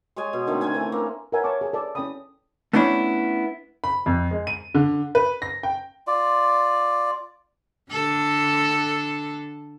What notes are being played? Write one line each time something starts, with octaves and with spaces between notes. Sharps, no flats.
G#3 G#4 C#5 G#5
B2
D3 D#3 A3 C4
D3 C4 C#4 G#5
E3 A3
A#3
A#4 B4 C#5 E5 F#5 G#5
C#5 A5 C#6 D6
G#4 G#5 A5
A4 B4 D5 A5
C#4 E4 A4 G5 B5 D#6
A3 B3 C#4 D4 E4
B5
F2
G#3
D#7
D3
B4
A#6
G5
F4 D5
D3 A4